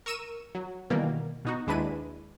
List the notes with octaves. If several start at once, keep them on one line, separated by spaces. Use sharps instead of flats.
A#4 C#6 E6 D#7 E7
F#3
B2 D#3 E3 G3 A#3
B2 D#4 F#4
D#2 G#3 D4 E4 B4 D#7